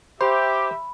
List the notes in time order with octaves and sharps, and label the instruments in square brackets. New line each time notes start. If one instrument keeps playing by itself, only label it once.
[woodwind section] G4 [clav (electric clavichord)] C5 [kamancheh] E5 [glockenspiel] B5